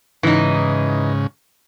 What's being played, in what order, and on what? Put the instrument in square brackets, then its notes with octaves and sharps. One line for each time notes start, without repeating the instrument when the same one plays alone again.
[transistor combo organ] G#2 C#3 [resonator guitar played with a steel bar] E3 D#4